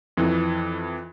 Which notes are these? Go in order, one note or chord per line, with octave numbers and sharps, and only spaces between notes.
F2 E3